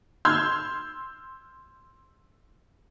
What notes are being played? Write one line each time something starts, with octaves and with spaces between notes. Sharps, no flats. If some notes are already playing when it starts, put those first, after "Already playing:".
C6 E6 F6 G6 G#6